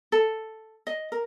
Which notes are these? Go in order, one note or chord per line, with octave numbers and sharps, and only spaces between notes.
A4
D#5
A#4